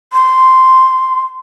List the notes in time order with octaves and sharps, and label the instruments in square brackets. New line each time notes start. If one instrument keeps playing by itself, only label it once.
[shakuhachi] C6